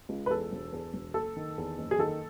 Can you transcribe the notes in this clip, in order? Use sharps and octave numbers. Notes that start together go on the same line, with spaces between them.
C#2
B4
E2 A4
E1
E2
E1
F#1 A4
D#3
E2
F#1
G#4
D#3 A4